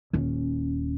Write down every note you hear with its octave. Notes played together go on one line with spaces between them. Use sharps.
D#1 C#4